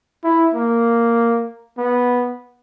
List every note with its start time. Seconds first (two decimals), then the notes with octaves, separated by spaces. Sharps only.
0.24 E4
0.54 A#3
1.78 B3